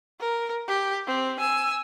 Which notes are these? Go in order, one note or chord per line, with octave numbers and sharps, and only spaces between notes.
A#4
G4
C4
G#5 E6